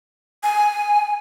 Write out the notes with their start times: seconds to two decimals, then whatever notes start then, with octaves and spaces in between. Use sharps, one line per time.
0.43 G#5